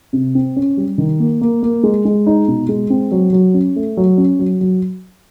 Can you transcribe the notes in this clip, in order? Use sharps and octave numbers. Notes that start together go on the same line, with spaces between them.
C3
C4
C#4
G3
D#3
A#3
A#3
A#3
G#3
G#3
D#4
B2
G#3
C4
F#3
F#3
C#4
A3
F#3
C#4
F#3
F#3